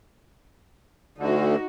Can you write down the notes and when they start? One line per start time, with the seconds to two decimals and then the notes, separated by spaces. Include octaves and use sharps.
1.18 D2 D3 D#4 F#4